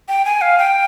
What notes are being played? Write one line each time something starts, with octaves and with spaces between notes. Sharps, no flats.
G5
G#5
F5
G5